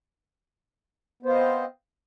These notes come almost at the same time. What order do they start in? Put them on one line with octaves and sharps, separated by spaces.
B3 C5 F5 D#5 C4